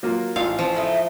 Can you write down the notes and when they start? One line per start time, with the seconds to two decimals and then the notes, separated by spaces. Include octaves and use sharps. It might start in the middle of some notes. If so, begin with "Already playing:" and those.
0.03 F#3 A#3 F4
0.36 A1 F4 F5
0.59 F3 C#4
0.75 A2 A3 D#4